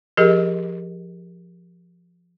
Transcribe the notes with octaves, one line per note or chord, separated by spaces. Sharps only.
F3 G4 G#4 A#4 D#5